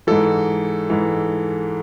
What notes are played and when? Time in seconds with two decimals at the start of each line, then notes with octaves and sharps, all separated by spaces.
0.07 G#2 E3 A4
0.90 G#2 E3